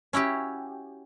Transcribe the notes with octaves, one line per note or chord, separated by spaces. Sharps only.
C#4 E4 F#4 G4